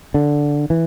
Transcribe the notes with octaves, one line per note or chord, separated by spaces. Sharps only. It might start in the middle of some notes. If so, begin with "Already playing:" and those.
D3
E3